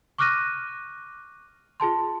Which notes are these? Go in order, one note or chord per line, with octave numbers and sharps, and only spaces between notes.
C#6 D6 F6 F#6 A#6 D#7
F4 G#4 A5 C6